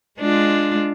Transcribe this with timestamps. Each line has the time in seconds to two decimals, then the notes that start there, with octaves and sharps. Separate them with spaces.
0.19 G#3 D4 F4